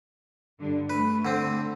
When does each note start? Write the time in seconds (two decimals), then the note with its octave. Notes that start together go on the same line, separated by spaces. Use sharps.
0.60 G2 D3
0.90 A3 B4
1.25 D3 C4